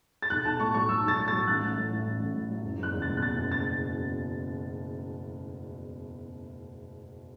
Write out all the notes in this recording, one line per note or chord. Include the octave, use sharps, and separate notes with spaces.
A6
B1 F#6
B1 A5
A2 C#6
F#3 C#6
B1 E6
B1 A6
A2
A6
F#3
A1 F#6
A1
A2
F#3
A1
A1
A2
F#3
F#1
F#1 F#6
E2
A6
B2
F#6
F#1 A6
F#1
A6